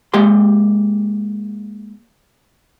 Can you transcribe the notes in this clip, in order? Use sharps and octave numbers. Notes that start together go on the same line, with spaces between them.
G#3 A#3 G4 C6